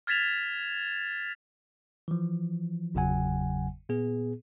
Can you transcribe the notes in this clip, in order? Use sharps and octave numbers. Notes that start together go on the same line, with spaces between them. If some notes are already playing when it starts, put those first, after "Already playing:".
F6 G#6 A6 B6 E7 F7
E3 F3
G1 E2 C#3 F#3 F#5 G#5
A#2 B3 G#4